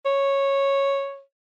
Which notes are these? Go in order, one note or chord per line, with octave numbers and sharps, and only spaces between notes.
C#5